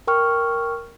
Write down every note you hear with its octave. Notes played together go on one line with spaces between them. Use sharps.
A#4 G5 C#6 F6